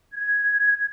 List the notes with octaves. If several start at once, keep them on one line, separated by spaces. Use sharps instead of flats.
G#6